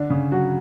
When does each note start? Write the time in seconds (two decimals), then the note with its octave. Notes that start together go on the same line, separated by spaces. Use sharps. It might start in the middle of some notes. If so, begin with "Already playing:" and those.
Already playing: D3 D4
0.10 C#3 C#4
0.32 F#3 F#4